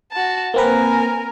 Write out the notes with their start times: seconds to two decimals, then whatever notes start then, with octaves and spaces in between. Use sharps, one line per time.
0.12 F#4 A5
0.54 A#3 C4 A#4 B4 G#5